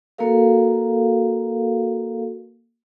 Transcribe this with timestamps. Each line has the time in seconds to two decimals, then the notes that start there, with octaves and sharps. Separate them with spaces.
0.18 A#3 F#4 A4 A#4 F5